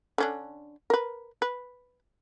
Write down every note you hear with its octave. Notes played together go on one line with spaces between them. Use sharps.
D3 C#4 D4
A#4 B4
B4